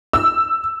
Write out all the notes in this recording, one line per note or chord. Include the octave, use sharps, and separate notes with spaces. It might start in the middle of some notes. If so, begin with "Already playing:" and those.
E6